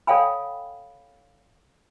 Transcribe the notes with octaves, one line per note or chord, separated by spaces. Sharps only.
A4 C#5 F5 G5 G#5 B5